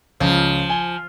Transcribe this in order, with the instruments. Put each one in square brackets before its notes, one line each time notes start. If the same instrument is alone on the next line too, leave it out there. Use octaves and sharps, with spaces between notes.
[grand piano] C#2 C#3 [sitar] F3
[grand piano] G#5 G7